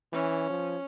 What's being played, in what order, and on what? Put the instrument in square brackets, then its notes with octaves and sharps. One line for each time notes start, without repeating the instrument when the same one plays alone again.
[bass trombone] E3 [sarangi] C#4
[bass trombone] F3